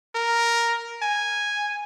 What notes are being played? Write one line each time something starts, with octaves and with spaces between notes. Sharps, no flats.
A#4
G#5